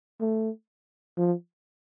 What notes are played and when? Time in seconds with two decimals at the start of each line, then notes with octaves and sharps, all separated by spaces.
0.21 A3
1.18 F3